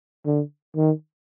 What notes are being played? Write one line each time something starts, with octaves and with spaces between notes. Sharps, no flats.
D3
D#3